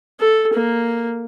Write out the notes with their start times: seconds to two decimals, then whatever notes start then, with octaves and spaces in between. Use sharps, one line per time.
0.20 A4
0.53 A#3